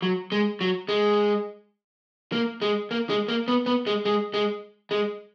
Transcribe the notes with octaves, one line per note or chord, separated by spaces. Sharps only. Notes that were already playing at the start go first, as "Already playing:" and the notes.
F#3
G#3
F#3
G#3
A#3
G#3
A#3
G#3
A#3
B3
B3
G#3
G#3
G#3
G#3